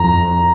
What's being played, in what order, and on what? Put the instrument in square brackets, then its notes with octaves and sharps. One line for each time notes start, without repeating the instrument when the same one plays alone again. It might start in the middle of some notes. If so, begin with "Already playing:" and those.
Already playing: [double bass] F2 [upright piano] A#5